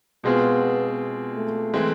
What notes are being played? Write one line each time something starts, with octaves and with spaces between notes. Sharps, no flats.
B2 G#3 B3 C4 F4 G#4
A3
E3 G#3 C4